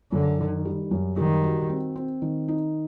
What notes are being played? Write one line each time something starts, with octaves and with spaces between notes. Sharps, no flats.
F#2 D3
D#3
G3
F#2
D#3 G3
F#4
C4
C4
D#3
D#4